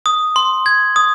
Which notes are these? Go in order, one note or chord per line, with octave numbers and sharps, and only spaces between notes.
D#6
C6
G#6
D#6